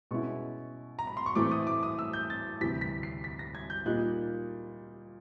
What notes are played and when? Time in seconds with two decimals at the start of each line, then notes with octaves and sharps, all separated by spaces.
0.11 B2 G#3 C#4 E4 C#6
0.99 A#5
1.07 B5
1.17 C6
1.26 C#6
1.35 A2 E3 A3 C4 E4 D6
1.51 D#6
1.67 D6
1.83 D#6
1.99 E6
2.13 G6
2.30 A6
2.61 D2 C3 E3 G3 B6
2.81 B6
3.03 C7
3.24 B6
3.39 A#6
3.55 G#6
3.70 G6
3.86 A#2 G3 A#3 D#4 F#6